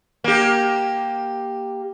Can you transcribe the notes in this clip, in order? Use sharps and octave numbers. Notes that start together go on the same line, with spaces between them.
A#3 G4